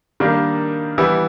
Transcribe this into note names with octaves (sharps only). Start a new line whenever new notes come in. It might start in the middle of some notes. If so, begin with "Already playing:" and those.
D#3 G3 A#3 D4
E3 G3 B3 E4